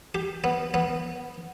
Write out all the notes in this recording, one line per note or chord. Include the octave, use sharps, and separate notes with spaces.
G4
B3
B3